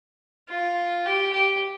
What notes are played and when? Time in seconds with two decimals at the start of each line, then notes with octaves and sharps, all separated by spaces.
0.49 F4
1.06 G4
1.33 G4